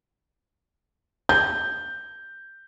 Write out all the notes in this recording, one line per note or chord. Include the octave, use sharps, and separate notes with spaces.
G6